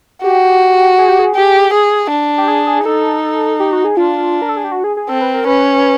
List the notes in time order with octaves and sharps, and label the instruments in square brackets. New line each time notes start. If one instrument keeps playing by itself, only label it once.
[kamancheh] F#4 [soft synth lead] G4
[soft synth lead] G#4
G4
G#4
[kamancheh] G4
G#4
D4
[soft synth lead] G4
G#4
G#4
[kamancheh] D#4 [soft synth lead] A4
[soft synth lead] G4
F#4
G#4
[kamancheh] D4 [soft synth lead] F4
[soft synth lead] A#4
A4
G#4
G4
F#4
G#4
G#4
[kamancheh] C4 [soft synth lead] A4
[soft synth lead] B4
A#4
[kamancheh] C#4 [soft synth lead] B4